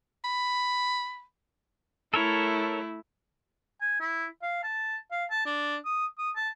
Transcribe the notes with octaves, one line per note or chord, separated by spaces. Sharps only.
B5
A3 E4 A4 A#4 C#5
G#5
E4
F5
A5
F5
A5
D4
D#6
D#6
A5